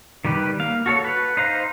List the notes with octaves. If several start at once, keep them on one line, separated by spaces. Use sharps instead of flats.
D#3 G3 G4 B4
A#3 F5
F#4 A4 C#5
B4
D#4 C5 F5 A#5